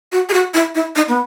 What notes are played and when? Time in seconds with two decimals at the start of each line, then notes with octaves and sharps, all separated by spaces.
0.12 F#4
0.29 G#4
0.34 F#4
0.54 E4
0.75 E4
0.96 D#4
1.08 B3